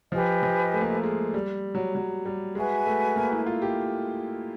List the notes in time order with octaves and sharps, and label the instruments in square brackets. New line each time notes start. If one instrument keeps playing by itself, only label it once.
[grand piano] F3 [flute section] G4 B4 D#5 G#5
[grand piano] F3
A3
A#3
A3
G#3
G3
F#3
F#3
G3
[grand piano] G#3 [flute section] F#4 B4 E5 G#5
[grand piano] A3
A#3
E4
F4
G4